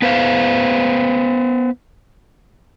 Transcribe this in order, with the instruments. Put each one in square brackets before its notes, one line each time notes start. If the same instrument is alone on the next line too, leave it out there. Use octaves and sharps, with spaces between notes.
[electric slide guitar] B3 B4 C5 F5